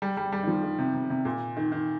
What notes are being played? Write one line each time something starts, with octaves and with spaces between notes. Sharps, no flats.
G3
G3
G3
D#3
F3
D#3
C3
C3
C3
A#2
D#3
D#3